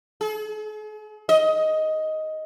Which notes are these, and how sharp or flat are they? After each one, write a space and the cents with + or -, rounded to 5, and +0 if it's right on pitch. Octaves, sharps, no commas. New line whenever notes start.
G#4 +45
D#5 +10